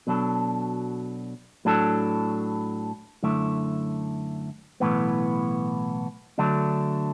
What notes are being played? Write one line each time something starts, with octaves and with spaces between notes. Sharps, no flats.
B2 F#3 D4 A4
A2 F#3 D4 A4
F#2 D3 A3 E4
B1 A2 E3 B3
D3 F#3 A3 D4